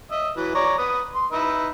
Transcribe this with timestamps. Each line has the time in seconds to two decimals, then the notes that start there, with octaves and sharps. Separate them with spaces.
0.11 D#5 E5
0.36 E3 F#3 B4
0.55 C#5 D5 A#5
0.78 B4 D#6
1.14 C6
1.32 D#4 B4 E5